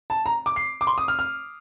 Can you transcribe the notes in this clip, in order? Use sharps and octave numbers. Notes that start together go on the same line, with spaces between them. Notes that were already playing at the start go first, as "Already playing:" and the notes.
A5
A#5
D6
C7
D6
C6
D#6
F6
F6